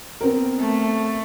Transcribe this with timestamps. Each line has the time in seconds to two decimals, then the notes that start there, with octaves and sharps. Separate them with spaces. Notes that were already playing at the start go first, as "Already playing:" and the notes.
0.21 B3 C4 A#4
0.60 A3